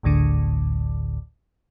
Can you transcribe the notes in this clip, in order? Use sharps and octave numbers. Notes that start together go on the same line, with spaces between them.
G#1 D2 A2 D3